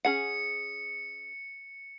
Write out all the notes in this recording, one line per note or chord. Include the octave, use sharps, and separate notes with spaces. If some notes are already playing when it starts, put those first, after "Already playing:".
C#4 G#4 F#5 C#7